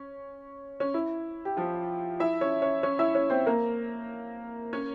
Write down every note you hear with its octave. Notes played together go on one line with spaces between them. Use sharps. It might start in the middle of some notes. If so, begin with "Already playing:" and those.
Already playing: C#4
C#4
E4
G4
F3 F4
E4 E5
C#4 C#5
C#4 C#5
C#4 C#5
E4 E5
C#4 C#5
C4 C5
A#3 A#4
C#4 C#5